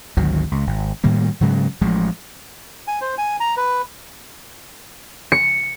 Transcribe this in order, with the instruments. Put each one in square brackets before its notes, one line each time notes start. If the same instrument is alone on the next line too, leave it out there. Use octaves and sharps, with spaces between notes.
[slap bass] G#1 D2 D#3 F#3
C#2
G#1
A2 D#3 G3 A#3
G#2 C#3 F#3 G#3
A1 F3 G#3
[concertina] G#5
C5
G#5
A#5
B4
[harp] C#7